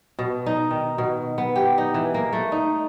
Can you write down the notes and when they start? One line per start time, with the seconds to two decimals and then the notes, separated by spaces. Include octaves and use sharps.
0.19 B2
0.46 D#4
0.71 D#3
0.98 B2
1.38 B3
1.56 G4
1.78 D#4
1.94 E3
2.14 A#3
2.33 A3
2.52 D#4